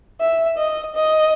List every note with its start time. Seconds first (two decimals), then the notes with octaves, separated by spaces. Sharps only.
0.20 E5
0.58 D#5
0.95 D#5